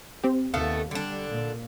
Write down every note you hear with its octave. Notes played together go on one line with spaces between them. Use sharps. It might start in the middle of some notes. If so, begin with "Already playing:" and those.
C4 G4
D#2 A3 B3 A4 F5
D3 G3 D4
A#2